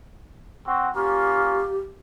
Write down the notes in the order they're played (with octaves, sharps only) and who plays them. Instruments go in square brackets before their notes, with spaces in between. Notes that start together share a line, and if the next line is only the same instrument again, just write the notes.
[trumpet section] C4 F#4
[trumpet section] A#3 C#4 F4 [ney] G4